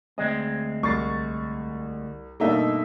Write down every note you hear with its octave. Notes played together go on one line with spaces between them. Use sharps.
D2 G#3 C4 D#5
C2 C#6 A6 C7
G2 B2 A3 A#3 D#4 E5